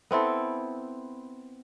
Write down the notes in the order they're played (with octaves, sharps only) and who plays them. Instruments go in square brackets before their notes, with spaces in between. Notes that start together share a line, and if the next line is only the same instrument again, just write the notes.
[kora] B3 C4 E4 A4